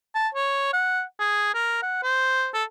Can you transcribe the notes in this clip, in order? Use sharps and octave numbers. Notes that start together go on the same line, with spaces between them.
A5
C#5
F#5
G#4
A#4
F#5
C5
A4